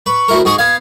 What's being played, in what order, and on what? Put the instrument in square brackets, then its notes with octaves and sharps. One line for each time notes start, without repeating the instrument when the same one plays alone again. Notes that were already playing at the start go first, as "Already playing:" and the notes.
[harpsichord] B4 [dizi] C#6
[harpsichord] D2 E4 A#4
[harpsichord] G#2 G#4 D#6 [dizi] C#6
[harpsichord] B3 F5 [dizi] G#6